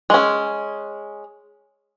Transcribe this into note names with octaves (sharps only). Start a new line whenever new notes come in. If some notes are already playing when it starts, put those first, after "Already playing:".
G#3 C#4